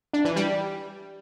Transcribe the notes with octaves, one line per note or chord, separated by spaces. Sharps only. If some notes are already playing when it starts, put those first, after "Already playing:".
D4
E3
G3